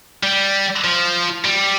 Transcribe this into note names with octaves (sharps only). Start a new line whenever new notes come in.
G3
F3
G3